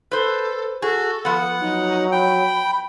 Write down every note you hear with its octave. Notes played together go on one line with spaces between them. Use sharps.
A4 B4 C5
F#4 G#4 A4
F3 B3 F#5
F#3 D#4
G5 B5